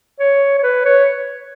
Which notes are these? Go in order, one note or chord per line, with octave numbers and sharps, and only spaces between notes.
C#5
C#5
B4
C#5